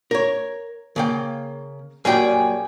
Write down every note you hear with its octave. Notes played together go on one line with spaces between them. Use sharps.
A#4 C#5
C#3 A#3 G5
F#2 A#2 G3 G#4 G5